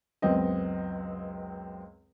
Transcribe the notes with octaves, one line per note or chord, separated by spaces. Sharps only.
C#2 F#2 B3 C4 D#5